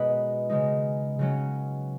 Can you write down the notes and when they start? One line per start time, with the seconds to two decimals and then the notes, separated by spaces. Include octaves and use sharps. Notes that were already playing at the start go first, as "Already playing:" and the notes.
Already playing: B2 G#3 B3 D#4 G#4 B4 C#5 D#5
0.49 C#3 G#3 D#4
1.19 C#3 F#3 C#4